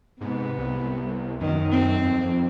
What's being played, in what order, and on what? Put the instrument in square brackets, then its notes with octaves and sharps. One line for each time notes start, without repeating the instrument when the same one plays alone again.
[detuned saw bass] G#2 [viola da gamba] C3 B3
[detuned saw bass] C2
[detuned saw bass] F#2 [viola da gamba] D#3
[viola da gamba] C4
[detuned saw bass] F2